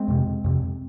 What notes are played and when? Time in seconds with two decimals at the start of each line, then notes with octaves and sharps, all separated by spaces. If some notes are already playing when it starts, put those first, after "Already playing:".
Already playing: G#3 C4
0.08 F2 C3
0.44 F2 C3